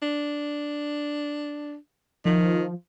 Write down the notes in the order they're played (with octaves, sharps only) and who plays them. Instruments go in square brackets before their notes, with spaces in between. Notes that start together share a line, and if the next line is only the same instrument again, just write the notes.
[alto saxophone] D4
[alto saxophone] D#3 [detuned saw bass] F3